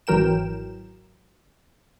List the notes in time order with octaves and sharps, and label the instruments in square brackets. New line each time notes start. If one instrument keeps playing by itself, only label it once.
[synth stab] G#1 E3 F#3 A#4 G5 E7